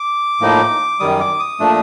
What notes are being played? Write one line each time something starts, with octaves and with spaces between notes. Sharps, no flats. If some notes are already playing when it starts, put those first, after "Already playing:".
Already playing: D6
A2 F3 A#3 D#4
F#2 D#3 G3 D#6
D6
D#6
A#2 F3 A3 D4